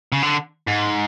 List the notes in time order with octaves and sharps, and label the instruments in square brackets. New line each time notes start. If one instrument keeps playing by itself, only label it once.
[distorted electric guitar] C#3
D3
G#2